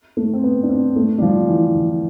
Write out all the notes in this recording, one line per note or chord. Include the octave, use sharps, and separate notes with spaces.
A3
C4
B3
D4
C4
A3
G3
F3
E3
E3